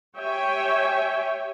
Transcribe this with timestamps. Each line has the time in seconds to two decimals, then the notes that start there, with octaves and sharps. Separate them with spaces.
0.18 G4 C#5 E5 G5 G#5